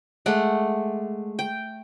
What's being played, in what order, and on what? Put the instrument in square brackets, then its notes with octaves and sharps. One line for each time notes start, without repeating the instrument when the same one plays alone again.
[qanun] G#3 A3 F#5 D6
G5